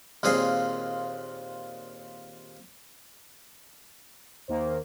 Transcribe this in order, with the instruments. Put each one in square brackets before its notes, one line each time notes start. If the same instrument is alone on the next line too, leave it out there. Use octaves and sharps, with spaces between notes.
[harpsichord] D#2 A#2 C4 G#4 F5
[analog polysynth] D#2 D#3 A#3 [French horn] C5